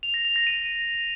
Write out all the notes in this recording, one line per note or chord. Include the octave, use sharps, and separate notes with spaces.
F7
A#6
F7
A#6
D#7